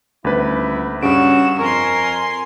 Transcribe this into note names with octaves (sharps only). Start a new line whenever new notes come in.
D#1 D2 E4 B4
G2 C#3 F#4 D7 E7
F2 A#4 G#5 C6 C#6